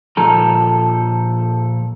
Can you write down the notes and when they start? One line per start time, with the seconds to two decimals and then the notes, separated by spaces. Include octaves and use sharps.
0.17 A#2 F3 A4 A#5